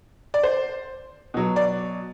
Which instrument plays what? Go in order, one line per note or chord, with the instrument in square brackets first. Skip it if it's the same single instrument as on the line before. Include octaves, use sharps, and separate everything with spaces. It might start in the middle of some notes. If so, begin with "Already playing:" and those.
[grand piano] D5
C5
B2 F#3
D5